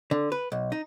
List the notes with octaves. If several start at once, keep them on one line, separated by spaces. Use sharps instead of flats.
D3
B4
B1
D#4